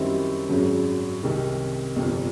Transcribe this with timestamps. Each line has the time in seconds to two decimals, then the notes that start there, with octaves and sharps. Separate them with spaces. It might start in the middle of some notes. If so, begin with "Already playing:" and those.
Already playing: F#2 D#3 G3 C4 E4
0.49 G#1 F#2 C#3 F#3
1.23 C2 C3 D#3
1.96 G1 F2 C3